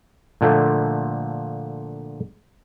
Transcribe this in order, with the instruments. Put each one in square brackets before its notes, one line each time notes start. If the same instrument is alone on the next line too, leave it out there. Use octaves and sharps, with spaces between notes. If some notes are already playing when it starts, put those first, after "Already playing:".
[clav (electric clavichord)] A#2 D3 F3 A3